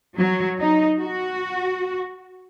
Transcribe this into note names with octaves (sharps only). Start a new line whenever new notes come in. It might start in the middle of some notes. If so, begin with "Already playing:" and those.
F#3
D#4
F#4